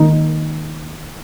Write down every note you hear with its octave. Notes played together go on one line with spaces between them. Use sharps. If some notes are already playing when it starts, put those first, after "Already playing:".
Already playing: D#3 A#3 D#4